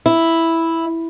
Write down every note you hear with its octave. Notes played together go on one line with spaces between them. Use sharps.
E4